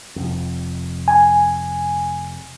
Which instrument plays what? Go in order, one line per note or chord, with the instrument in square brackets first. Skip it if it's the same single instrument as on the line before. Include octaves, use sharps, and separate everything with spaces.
[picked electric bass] F1 F2
[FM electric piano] G#5